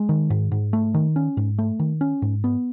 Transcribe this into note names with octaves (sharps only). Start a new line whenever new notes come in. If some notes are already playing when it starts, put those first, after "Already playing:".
Already playing: G#3
D#3
G#2
G#2
A3
D#3
C#4
G#2
A3
D#3
C#4
G#2
B3